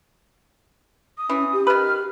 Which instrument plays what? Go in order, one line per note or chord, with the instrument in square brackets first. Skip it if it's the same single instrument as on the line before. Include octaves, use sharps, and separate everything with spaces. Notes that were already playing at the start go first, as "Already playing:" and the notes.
[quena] D#6
[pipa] E3 [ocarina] C#4
[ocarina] G4
[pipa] D#3 B4 [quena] F6